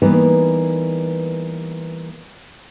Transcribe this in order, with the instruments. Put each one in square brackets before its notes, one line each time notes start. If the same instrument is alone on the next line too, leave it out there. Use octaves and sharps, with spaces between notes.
[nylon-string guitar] E3 G3 A#3 B3 D#4 B4